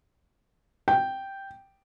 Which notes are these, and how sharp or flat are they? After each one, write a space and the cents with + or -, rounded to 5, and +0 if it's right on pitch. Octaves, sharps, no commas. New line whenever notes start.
G5 -5